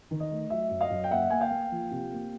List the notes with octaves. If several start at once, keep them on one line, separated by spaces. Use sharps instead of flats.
D#3
D#5
A3
F#3 E5
F#2
D#5 F5
F#2
G5
A#3 E5 F#5
A#3 G#5
F5 G5
A#3
F3
C3
A#3